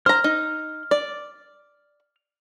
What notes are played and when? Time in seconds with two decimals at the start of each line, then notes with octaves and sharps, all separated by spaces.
0.06 C5 A#5 F6
0.24 D#4
0.91 D5